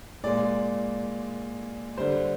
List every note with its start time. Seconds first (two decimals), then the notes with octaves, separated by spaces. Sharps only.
0.24 A#2 G#3 D5
1.97 D3 G3 C5